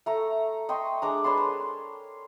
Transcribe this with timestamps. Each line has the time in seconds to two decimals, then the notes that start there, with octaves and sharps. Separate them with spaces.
0.06 A3 A#5
0.69 D#5 G5 C6 C#6
1.02 G#3 D4 A#5
1.24 B4 C#5 A5 C6
1.37 A#4